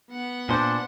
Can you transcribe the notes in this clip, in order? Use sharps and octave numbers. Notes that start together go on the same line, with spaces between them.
B3 F#5
A#2 D4 C5